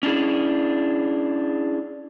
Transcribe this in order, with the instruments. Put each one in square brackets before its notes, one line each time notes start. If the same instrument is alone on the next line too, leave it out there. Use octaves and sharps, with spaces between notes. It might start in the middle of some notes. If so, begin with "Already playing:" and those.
[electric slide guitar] C#4 D4 E4 G#4